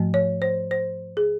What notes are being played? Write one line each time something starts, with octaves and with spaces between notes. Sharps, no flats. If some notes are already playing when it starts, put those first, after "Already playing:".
Already playing: G#2 F3 A3
C#5
C5
C5
G#4